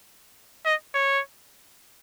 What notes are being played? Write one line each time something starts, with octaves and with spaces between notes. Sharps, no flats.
D#5
C#5